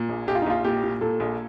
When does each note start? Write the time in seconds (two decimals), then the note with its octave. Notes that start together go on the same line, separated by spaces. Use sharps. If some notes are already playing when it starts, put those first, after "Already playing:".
Already playing: A#2
0.09 A#1
0.27 A#1 G4
0.35 F4
0.42 D#4
0.46 A#1 F4
0.64 A#2 G4
0.83 A#2
1.01 A#2 A4
1.20 A#1